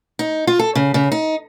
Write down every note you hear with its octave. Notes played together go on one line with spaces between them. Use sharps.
D#4
F4
A4
C#3
C#3
D#4